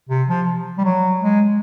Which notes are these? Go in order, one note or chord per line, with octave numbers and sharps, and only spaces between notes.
C3
F3
G3
F#3
G#3